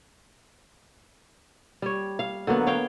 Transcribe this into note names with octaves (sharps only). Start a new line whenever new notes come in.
G3 C#5
F5
D3 F#3 A#3 B3
C#5 F5 G5